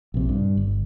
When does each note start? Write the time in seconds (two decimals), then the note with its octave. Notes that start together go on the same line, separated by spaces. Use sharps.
0.14 A#1 C3
0.29 G2
0.57 G1